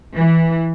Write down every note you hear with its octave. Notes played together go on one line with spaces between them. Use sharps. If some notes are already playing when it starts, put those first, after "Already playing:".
E3